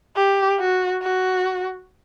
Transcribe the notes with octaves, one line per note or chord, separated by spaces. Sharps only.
G4
F#4
F#4